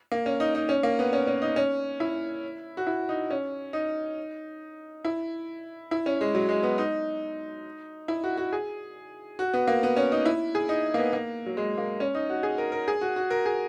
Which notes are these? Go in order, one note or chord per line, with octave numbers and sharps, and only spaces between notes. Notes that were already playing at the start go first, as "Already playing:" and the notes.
A#3
C#4
D#4
D#4
C#4
A#3
B3
C#4
C#4
D#4
C#4
E4
F#4
E4
D#4
C#4
D#4
E4
E4
C#4
G#3
F#3
G#3
B3
D#4
E4
F#4
F#4
G#4
F#4
B3
A#3
B3
C#4
D#4
E4
G#4
D#4
A#3
B3
A#3
F#3
G#3
A#3
C#4
D#4
F#4
G#4
A#4
A#4
G#4
F#4
F#4
A#4
G#4